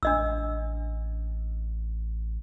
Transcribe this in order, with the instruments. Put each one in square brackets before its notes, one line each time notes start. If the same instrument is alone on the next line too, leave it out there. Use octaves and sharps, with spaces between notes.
[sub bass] A1 [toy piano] D4 D#5 E6